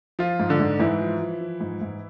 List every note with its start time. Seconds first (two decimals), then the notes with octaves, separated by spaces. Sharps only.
0.19 F3 F4
0.40 G#2
0.49 D3 D4
0.60 G#2
0.80 G#2 E3 E4
1.01 F3
1.21 F3
1.41 F3
1.61 G#2
1.82 G#2